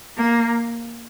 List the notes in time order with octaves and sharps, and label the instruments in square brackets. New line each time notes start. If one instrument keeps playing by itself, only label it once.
[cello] A#3